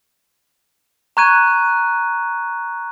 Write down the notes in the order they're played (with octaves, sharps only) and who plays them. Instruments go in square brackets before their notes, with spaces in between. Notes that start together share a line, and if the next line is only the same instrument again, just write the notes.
[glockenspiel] A#5 C#6 F#6 G#6 D#7